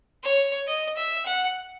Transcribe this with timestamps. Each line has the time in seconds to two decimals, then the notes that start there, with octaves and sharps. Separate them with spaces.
0.24 C#5
0.67 D#5
0.97 E5
1.26 F#5